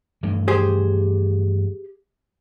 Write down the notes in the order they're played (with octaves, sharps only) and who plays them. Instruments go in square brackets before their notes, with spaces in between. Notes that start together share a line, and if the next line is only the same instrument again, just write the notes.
[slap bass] G2 E3 A3
[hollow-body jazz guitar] G4 G#4 C5